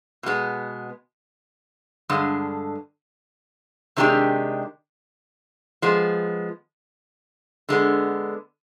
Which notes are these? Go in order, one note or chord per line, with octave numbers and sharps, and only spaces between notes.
B2 G#3 B3
G2 D3 G#3
C3 D#3 G#3 D4 G4
F3 G#3 B3
D3 G#3 B3